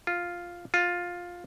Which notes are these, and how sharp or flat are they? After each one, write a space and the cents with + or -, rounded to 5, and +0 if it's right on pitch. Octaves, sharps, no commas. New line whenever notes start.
F4 +0
F4 +10